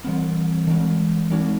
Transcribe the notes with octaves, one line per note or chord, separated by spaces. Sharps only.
E3 G3 C4
E3 G#3 C4
E3 G#3 C4 D#4